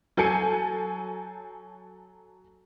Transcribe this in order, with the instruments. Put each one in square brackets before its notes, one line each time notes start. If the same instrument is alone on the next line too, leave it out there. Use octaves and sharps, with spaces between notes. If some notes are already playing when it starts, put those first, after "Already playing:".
[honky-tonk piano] F#3 A4 G#5 G6 C7 C#7